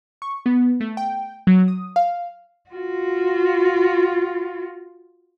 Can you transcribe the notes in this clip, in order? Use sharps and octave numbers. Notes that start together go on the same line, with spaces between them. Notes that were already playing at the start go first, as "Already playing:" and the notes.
C#6
B3
A3
G5
F#3
D#6
F5
F4 F#4